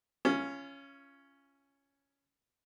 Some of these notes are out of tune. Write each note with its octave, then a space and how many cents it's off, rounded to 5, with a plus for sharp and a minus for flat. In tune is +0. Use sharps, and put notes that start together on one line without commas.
C#4 +0 F4 -35